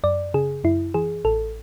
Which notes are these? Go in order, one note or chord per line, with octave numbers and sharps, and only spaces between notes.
F#2 D5
C#3 G#4
F#2 E4
E3 G#4
A1 A4